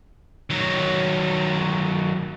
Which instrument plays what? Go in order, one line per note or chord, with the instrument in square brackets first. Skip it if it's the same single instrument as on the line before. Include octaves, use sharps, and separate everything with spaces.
[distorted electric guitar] D#3 F#3